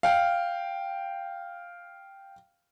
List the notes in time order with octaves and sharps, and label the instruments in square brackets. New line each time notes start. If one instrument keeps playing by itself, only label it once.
[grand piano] F5 G5